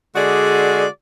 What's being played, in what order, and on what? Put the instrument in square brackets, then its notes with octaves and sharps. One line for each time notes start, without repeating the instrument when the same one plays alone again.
[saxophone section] D3 G#3 F#4 G#4 D5